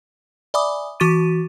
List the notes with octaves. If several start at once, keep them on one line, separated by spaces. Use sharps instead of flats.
D5 E5 G#5 B5 D6 D#6
E3 F#4 C#6 D6 A6 D#7